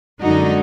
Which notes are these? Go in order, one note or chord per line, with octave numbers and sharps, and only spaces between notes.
F#2 D3 G#3 D#4 F#4